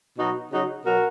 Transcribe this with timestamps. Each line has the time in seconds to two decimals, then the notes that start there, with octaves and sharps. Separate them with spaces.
0.19 B2 F#3 D#4 F#4
0.52 C#3 F#3 D#4 F#4
0.85 B2 F#3 F#4 A#4